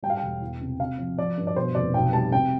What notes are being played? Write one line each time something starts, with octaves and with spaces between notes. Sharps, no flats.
G3 G5
F5
E1 G5
E2
C3
C3 F5
F3
F3 D5
G2
D5
B2 C5
F1 D5
B1 G5
G3 A5
C3 G5